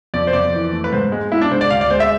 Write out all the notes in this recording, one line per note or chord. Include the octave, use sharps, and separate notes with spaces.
F2 D5
C5
F2 D5
E3
A3
B4
G#2 C5
G#3
G#3 E4
D4
G#2 C5
D5
D2 F5
D5
G#3 C5
E5